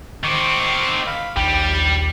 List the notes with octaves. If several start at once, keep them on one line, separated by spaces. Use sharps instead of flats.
D#3 C4 C#6 D6
F5 B5
A#1 D#2 G3 G5 B5